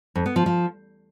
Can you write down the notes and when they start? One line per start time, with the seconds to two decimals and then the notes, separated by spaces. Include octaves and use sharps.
0.15 F2
0.26 B3
0.36 F3
0.46 F3